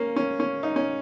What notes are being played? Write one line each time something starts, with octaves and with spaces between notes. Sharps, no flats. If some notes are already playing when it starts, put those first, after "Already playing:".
Already playing: A#3 C#4
C#4
C#4
D#4
C#4